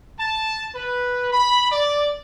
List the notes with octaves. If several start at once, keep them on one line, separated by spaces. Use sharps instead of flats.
A5
B4
B5
D5